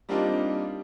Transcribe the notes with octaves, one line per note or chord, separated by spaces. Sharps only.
G3 A#3 C4 D4 D#4 F4